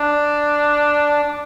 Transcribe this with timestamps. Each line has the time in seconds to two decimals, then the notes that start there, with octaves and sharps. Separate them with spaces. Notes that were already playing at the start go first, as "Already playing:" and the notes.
Already playing: D4
1.23 D4